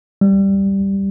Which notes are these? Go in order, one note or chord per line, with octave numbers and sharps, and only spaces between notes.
G3